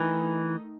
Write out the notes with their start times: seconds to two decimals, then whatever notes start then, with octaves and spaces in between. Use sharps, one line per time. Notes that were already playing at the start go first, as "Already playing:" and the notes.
Already playing: D#3 E3 A3 D#4